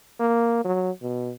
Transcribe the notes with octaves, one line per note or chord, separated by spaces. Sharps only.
A#3
F#3
B2